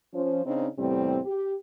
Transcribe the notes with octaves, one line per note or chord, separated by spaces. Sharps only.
F3 C#4 C5
C#3 C4 D4 D#4
E2 A2 C3 G3 C4
G4